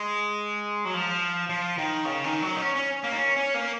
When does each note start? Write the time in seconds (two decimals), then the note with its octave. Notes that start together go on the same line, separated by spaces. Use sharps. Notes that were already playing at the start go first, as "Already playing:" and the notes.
Already playing: G#3
0.85 F#3
0.94 F3
1.49 F3
1.78 D#3
2.05 C#3
2.24 D#3
2.42 F#3
2.56 D#4
2.62 C#4
2.75 C#4
3.04 A#3
3.12 D#4
3.17 C#4
3.36 C#4
3.54 A#3